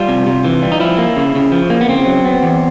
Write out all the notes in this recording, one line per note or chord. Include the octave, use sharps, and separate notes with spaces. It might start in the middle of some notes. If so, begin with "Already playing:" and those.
Already playing: G3 F4
C3
C3
E3
G3
D#4
F3 E4
A#3
C#3
C#3
F3
A#3
B3
C#3 C4
F#3
B3
E2